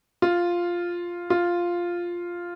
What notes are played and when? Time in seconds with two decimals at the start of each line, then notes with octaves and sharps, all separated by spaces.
0.22 F4
1.30 F4